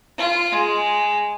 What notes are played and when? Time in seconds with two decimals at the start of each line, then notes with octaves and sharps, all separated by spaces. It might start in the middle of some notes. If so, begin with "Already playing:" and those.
0.18 F4
0.53 G#3